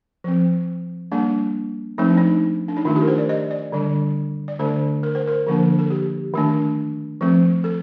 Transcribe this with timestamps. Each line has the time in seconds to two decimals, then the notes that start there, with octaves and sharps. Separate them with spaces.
0.24 F3 C4
1.12 G3 A#3 D4
1.98 F3 A3 C4 D#4
2.08 D4
2.17 D#4
2.68 D4
2.77 D#4
2.85 D#3 A3 D4 F4
2.96 G4
3.02 A#4
3.08 C5
3.18 D5
3.29 D#5
3.51 D5
3.72 D3 G3 D4
4.48 D5
4.59 D3 A3 D4 C5
5.03 A#4
5.15 C5
5.27 A#4
5.46 D3 F3 A#3 D4
5.79 A4
5.90 G4
6.34 D#3 A3 D4
7.21 F3 A3 C4
7.64 A4